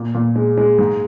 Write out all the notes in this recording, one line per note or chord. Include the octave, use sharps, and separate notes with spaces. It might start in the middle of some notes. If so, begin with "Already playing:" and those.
Already playing: A#2
A#2
G#3
G#3
G#2